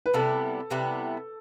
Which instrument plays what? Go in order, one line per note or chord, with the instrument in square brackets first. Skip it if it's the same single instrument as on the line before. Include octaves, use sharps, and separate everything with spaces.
[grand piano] B4
[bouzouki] C3 G3 B3 E4 [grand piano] A4
[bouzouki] C3 G3 B3 E4